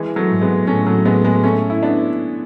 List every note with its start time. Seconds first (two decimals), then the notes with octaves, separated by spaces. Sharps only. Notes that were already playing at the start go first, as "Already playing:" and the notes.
Already playing: E3 G#3
0.16 F#3 A3
0.29 G#2
0.41 G#3 B3
0.67 A2 A3 C#4
0.86 F#3 A3
1.05 G#3 B3
1.25 G#3 B3
1.43 A3 C#4
1.70 E4
1.83 B3 D4